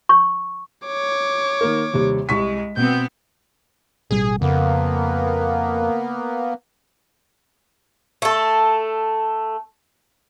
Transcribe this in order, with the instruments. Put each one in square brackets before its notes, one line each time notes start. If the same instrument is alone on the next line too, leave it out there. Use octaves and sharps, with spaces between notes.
[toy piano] C#6
[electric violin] C#5 D6
[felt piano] D#3 A#3 A#4
D#2 C3 G3
[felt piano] C2 C#6 B6 [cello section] G#3
[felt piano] B2 [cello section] B3 C4 [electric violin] G6
[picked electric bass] A1 B2 G3 [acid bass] G#4
[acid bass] F2 [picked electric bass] C#3 [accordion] A#3 B3
[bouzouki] A3 A4